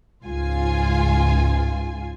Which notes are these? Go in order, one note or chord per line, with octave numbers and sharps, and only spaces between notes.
C#2 G#2 F4 G#5